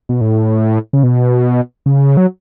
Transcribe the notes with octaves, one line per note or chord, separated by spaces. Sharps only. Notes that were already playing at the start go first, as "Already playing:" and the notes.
B2
A2
C#3
B2
C#3
F#3